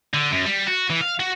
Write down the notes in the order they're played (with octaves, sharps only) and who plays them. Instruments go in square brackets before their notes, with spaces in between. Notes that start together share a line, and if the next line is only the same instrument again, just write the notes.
[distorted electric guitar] D3
F#2
G3
F#4
E3
F5
F#4